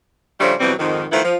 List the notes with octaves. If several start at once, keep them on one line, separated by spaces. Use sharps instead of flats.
C#3 F3 G3 A3 D4
B2 E3 F#3 G3 C4
F2 G#2 D#3
D#3 F3 A3 B3 E4
F3